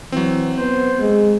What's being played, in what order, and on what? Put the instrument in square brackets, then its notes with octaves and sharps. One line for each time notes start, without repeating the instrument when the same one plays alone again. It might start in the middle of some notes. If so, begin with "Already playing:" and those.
[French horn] E3 [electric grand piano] F#3 C4
[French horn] B3 [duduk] C5
[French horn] G#3